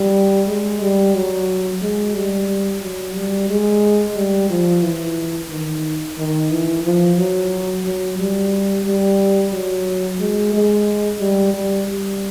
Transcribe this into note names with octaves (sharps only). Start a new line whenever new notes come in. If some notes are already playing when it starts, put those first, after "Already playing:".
Already playing: G3
G#3
G3
F#3
G#3
G3
F#3
G3
G#3
G3
F3
E3
D#3
D#3
E3
F3
F#3
F#3
G3
G3
F#3
G#3
G#3
G3
G3
G3